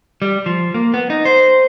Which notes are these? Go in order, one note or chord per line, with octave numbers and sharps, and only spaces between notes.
G3
F3
A#3
B3
D#4
C5